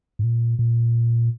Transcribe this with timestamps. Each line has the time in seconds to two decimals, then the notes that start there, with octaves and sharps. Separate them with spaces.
0.19 G#2
0.24 A#2
0.59 A#2